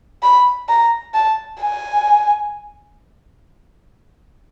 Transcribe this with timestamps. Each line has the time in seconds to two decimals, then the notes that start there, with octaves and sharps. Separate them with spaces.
0.23 B5
0.69 A#5
1.14 A5
1.61 G#5